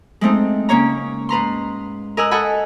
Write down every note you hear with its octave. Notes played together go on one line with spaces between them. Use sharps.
G#3 A3 C4 D#4
C#3 A#3 C#4 C#5 A#5
G#2 B4 A#5 C6
A#4 D#5 G#5 E6 F#6
A4 D#5 F#5 G#5 B5